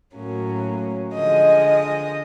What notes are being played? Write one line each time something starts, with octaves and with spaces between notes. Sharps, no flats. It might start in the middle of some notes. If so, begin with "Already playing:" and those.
A2 F#3 A#3 C#4
D3 F3 G#3 D#5
D#5